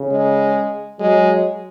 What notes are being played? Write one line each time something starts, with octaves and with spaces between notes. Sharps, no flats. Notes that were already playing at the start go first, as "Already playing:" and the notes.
Already playing: C#3
G#3
F#3 G#3